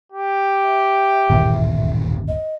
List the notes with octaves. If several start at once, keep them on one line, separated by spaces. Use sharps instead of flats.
G4
E5
D1 G1 D#2 A#2 D#3 E3
D#5